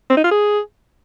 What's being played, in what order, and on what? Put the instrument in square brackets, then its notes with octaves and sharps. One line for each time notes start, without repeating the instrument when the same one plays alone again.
[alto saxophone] C4
D#4
F4
G#4